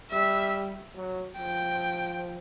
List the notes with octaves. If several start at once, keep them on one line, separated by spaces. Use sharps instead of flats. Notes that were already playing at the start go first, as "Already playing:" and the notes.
G3 E5
F#3
F3 G5